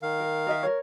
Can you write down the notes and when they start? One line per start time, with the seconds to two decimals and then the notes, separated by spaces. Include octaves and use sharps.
0.02 D#3 F5
0.20 A#4
0.47 A#4 D#5 E5
0.63 A#4 C#5